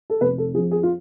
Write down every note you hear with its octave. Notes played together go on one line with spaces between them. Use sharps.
A4
F1 B4
A4
F2 F3 G#4
G#4
F4